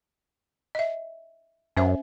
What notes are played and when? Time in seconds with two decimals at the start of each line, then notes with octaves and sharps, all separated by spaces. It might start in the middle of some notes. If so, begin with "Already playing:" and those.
0.75 D#5 E5
1.77 F#2 C#4 C5 E5